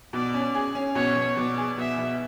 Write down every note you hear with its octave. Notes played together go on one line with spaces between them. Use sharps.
B2 D5
C#4
G#4
C#4
B2 C#5
B2
B2 D5
G#4
B2 E5
B2